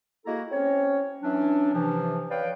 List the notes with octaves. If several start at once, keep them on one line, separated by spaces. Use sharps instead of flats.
G#3 A#3 E4 F#4 A4 A#5
C4 C#4 C#5
E3 F#3 C#4 D4
C3 E3 F3
B4 C#5 D5 F5 G5